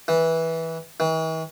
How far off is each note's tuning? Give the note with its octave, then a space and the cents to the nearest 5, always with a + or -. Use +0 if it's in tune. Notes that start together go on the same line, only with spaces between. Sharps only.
E3 -15
E3 -45